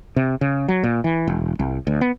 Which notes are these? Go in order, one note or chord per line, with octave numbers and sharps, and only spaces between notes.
C3
C#3
F#3
A#2
E3
E1
C2
D2
B3